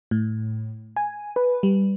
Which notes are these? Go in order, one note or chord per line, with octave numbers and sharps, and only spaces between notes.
A2
G#5
B4
G3